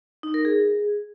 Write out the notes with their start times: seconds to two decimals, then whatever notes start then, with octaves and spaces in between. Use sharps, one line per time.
0.23 D#4
0.34 A#4
0.45 G#4